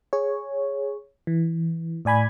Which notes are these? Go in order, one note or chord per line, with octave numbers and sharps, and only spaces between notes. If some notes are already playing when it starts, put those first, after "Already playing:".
G#4 C#5
E3
A2 D5 G#5 B5 G#6